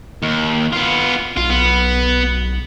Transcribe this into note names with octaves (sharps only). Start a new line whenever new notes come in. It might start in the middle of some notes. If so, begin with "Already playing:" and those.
D#2
B3 F4
B1 F4
B3